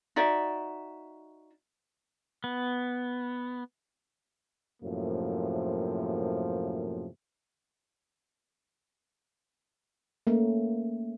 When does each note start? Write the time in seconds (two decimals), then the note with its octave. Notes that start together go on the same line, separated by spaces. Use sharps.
0.16 D#4 F#4 D5 E5
2.44 B3
4.83 F#2 A2 C3 F3 A#3
10.27 A3 A#3 C#4